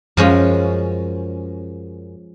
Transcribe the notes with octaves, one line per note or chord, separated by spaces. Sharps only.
F#2 F3 G#3 C#4